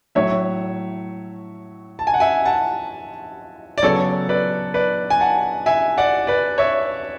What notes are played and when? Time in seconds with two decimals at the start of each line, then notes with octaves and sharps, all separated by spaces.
0.15 A2 F#3 A3 C#5 E5
1.99 A5
2.07 G#5
2.14 F#5
2.20 E5 G#5
2.45 F#5 A5
3.78 D5
3.82 C#3 F#3 B3 A4 C#5
4.29 B4 D5
4.74 B4 D5
5.10 G#5
5.20 F#5 A5
5.66 E5 G#5
5.98 D5 F#5
6.27 B4 D5
6.58 C#5 E5